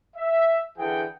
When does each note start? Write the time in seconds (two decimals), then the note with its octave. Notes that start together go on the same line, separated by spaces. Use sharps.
0.16 E5
0.78 D3 E3 G#4 F#5 G5